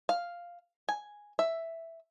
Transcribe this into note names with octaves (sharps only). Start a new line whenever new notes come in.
F5
G#5
E5